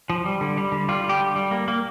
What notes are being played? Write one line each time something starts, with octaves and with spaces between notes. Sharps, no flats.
F3
G3
D3
G3
D3
G3 F4
G3
G4
D3
G3
A#3
A#3